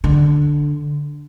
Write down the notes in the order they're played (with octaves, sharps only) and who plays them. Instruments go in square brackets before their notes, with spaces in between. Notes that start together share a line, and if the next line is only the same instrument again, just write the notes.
[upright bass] D3